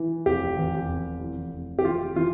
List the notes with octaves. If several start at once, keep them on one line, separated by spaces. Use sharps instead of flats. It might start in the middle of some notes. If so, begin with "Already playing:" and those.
Already playing: E3
F1 G4
E2
F1
E3
F1
G4
E3 F4
E3 F4